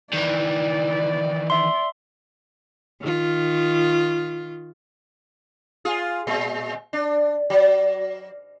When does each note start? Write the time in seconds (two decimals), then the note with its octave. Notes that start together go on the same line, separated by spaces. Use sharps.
0.13 D#3 E3 D5
1.50 E5 C6
3.01 D#3 F4
5.85 F4 G#4
6.27 A#2 G#3
6.93 D4
7.50 F#3